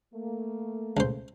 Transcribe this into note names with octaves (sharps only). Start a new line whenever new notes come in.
A3 A#3
C#2 C5